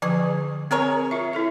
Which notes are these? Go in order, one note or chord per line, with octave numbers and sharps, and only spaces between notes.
D3 F3 G#4
C4 G#4 A#4 C#5
F4 E5
E4 A4 E5